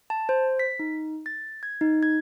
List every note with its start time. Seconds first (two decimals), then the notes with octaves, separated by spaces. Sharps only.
0.10 A5
0.29 C5
0.59 B6
0.79 D#4
1.26 A6
1.63 G#6
1.81 D#4
2.03 G#6